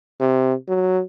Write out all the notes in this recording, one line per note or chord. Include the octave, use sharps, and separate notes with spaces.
C3
F#3